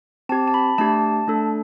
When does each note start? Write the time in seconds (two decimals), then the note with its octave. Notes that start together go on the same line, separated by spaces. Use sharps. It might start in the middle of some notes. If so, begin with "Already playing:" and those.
0.29 C4 G4 A5
0.48 A5
0.54 B5
0.78 A3 D4 G4 A5
1.28 A3 D4 A4